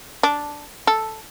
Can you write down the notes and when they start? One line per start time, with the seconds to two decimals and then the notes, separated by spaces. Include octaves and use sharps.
0.23 D4
0.87 A4